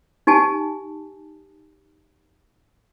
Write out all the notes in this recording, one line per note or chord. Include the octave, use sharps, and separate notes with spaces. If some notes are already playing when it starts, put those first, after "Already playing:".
D#4 G4 G#5 A5